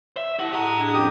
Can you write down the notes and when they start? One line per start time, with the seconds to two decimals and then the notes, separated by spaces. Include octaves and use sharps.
0.17 E5
0.39 E4 G4 F#5 A5
0.52 A2 G4 D#5 A#5 D#6
0.78 D4 G#4
0.94 F2 C#4 G4 D#6